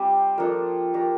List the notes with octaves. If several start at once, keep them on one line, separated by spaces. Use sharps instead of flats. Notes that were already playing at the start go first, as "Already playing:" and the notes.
Already playing: G3 C4 G4 D5
F3 A#3 D4 A4
D4 G4 A#4